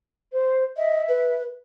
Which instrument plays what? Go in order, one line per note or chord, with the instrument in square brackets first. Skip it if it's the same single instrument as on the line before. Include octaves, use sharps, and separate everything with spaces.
[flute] C5
[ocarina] D#5 [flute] E5
[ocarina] B4